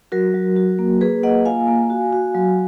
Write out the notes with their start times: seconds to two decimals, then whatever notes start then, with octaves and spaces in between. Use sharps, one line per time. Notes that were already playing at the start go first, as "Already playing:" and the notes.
0.12 F#3 F#4 A#4
0.34 F#3
0.56 F#4
0.79 A#3
1.01 A#3 G#4 B4
1.23 A#3 D#5 F#5
1.45 F4 F5 G#5
1.68 A#3
1.90 F#4
2.13 F#4
2.35 F#3